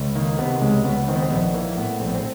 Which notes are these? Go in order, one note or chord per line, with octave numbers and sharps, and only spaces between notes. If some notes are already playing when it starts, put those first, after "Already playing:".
Already playing: C#2
D#3 A#3
C3 B3
C#2 G#3
C#2 B3
D#3 C4
B3
C4
A#1 B3
E3 A#3
A2 B3
A#1 C4
B3
C4